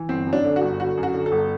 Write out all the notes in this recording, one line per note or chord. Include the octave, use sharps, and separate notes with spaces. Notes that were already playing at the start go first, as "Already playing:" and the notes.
Already playing: E3
G1 C4
F#2
D4
D3
F#4
G1
D3 F#4
F#2
F#4
D3
A4
G1